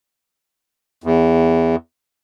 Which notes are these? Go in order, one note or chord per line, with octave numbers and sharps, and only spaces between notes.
E2